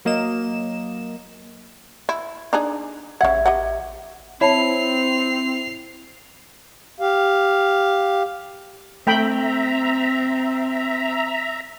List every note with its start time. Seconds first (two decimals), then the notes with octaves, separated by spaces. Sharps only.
0.05 F#3 A#3 D#5 E7
2.09 E4
2.53 D4 D#4 G#4
3.21 A1 C#3 E5 F#5 G#6
3.46 G4 D#5 F#5
4.41 C4 E4 C#5 A5 B5 C7 F7
7.00 G4 F5
9.07 A3 C4 E5 G5 A#5 B5